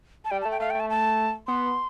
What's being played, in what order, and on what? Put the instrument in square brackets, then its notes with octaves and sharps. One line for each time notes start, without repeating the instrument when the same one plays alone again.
[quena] A5
[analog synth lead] G3 [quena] G5
[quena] A5
[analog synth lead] A3
[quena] G5
[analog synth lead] A3 [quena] F5
[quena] G5
[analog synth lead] A3
[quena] A5
A5
[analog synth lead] B3 [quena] C6